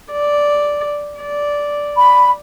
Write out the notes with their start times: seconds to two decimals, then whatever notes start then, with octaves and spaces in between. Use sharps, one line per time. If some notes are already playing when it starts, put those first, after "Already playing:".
0.12 D5
1.21 D5
1.97 B5